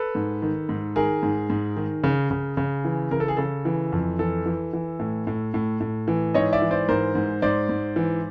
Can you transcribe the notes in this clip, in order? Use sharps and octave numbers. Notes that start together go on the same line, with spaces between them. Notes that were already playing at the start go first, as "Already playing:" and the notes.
Already playing: A4 B4
G#2
D#3
G#2
D#3 G#4 A#4
G#2
G#2
D#3
C#3
C#3
C#3
E3
C#3 A#4
A4
G#4
C#3 A4
E3
F2
E3 A4
E3
E3
A2
A2
A2
A2
E3
G#2 C#5 D#5
D5 E5
E3
C5 D5
G#2 A#4 C5
G#2
G#2 C5 D5
G#2
E3